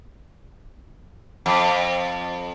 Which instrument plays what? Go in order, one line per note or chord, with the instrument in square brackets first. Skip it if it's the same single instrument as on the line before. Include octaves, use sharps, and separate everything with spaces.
[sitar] F2